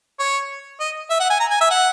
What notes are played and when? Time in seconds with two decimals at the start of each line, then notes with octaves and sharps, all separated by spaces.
0.20 C#5
0.80 D#5
1.10 E5
1.20 F#5
1.30 G#5
1.40 A#5
1.51 G#5
1.61 E5
1.71 F#5